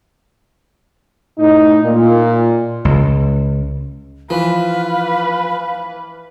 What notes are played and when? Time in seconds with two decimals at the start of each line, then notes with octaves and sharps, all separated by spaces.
1.38 A2 D#4
1.84 A#2
2.85 C#2
4.30 E3 F3 B4 F5